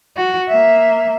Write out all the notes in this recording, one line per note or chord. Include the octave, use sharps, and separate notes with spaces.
F#4
A#3 E5